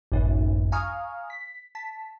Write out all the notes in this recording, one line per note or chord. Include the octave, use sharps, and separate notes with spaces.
G#1 C#2 F#2 A2
F5 G#5 A#5 C#6 D#6 F6
B6
A5 B6